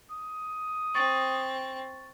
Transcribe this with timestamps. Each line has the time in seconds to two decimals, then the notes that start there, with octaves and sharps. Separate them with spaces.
0.11 D#6
0.95 C4 C#6 A6